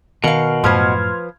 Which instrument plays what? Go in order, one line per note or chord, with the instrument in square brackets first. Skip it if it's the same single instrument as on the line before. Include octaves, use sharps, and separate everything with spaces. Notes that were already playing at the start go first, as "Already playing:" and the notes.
[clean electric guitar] B2 [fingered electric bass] D#3 [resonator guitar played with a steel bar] A#4 F5
[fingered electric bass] F#2 A2 [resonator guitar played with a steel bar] F3 B4 C5 [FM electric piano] C6 F6 G#6